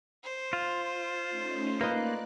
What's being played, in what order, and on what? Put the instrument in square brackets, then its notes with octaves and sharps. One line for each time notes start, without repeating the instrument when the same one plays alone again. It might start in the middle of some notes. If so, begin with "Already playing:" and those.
[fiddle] C5
[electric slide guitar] F4
[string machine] A3 C#4 D#4
[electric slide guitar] A#3 [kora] D#4 F4 B4 [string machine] D5 F#6